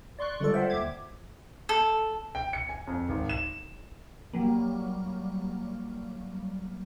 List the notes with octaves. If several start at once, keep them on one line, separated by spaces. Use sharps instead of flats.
D5 C6 C#6 F#6
D3 G3 G#3 F4 A4 D5
C5 E5 F#5 G5
D#2 E5 D6 G#6
A4
G5
C#7
G#5
F2
G#1
E7
F#3 G3 A#3